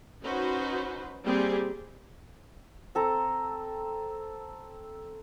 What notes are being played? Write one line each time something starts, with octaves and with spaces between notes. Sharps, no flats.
C#4 D#4 F#4 B4 C5
G3 A#3 C4 G4 G#4
C4 A4 A#5